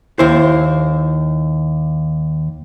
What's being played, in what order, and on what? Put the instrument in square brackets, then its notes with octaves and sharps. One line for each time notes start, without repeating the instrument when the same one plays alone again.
[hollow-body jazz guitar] D#2 E4 C5